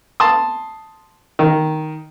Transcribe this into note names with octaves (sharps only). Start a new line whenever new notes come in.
A5 C6 D#6
D#3